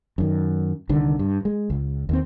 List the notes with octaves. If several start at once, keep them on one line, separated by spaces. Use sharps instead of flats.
F#2 D#3
C2 D3 D#3
G2
G#3
C#2
D#2 C4